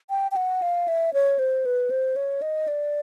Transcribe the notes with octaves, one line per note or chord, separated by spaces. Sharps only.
G5
G5
F#5
F5
E5
C#5
C5
B4
C5
C#5
D#5
D5